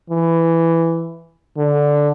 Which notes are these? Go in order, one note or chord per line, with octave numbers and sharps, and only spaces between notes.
E3
D3